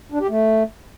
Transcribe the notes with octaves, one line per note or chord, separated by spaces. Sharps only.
D4
G4
A3